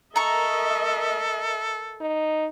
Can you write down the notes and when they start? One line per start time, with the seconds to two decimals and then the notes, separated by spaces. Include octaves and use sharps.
0.16 A4 A#4 D#5 E5 A#5 C#6
2.01 D#4